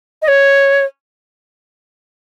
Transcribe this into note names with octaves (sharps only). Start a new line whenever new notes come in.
D#5
C#5